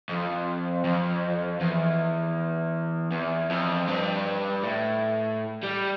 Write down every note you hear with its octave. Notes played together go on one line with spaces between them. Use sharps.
F2
F2
E2
E2
F2
G2
A2
G3